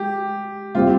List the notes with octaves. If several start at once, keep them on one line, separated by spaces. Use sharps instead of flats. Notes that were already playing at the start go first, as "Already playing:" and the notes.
Already playing: G#3 G4
G3 C4 F4 G4 C5